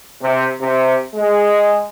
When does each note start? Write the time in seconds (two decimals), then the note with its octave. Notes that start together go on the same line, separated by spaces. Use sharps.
0.22 C3
0.60 C3
1.15 G#3